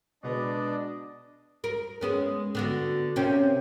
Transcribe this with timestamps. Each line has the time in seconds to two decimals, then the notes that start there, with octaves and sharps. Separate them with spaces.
0.23 B2 G#3 B3 D4 D5 D#5
1.64 A#4
2.01 G#3 B3 C#4
2.55 D3 B3 F#4
3.16 C3 A#3 C#4